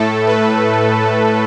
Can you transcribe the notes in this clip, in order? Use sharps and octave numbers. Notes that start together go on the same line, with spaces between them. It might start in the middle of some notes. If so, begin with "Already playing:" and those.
Already playing: A2 A3 A4
B4